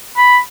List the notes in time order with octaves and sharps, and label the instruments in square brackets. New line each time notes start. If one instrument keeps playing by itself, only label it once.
[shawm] B5